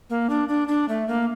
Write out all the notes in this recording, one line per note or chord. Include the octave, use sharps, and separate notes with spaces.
A#3
D4
D4
D4
A3
A#3